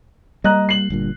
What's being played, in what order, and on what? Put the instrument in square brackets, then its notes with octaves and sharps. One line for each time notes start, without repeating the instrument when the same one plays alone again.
[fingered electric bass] G3 A#3 [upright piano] D#5 A#5 F#6
[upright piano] C7 F#7
[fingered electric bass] G1 G2 A#2